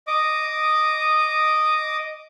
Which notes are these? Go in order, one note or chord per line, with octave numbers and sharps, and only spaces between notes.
D#5 D6 D#6